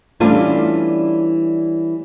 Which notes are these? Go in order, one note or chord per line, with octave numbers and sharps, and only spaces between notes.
E3 G3 A3 C#4 D4 F4